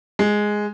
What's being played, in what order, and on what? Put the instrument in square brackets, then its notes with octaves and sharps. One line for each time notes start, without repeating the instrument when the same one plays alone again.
[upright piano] G#3